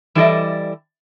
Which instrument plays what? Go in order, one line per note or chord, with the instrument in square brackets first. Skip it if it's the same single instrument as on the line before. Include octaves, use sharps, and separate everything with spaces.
[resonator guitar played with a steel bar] E3 G3 E4 A4 D5 D#5